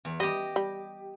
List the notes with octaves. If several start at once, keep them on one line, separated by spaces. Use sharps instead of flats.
E2
G3 G4 D#5
G3